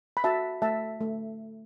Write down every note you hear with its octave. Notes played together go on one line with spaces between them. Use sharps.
B5
F#4 E5 A5
A3 E5 A5
A3